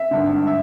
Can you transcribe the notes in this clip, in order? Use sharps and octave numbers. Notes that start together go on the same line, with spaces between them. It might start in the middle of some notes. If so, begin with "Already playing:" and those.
Already playing: E5
G#1 G2 D3
E5